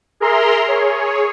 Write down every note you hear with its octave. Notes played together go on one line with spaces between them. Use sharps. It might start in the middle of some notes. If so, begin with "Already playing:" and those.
G#4 A#4 E5 A#5 C6
G#4 C#5